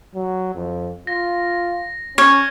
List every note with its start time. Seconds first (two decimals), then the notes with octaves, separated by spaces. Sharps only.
0.15 F#3
0.55 F2
1.07 F4 A#6
2.18 C#4 C#5 C#6 F6 G#6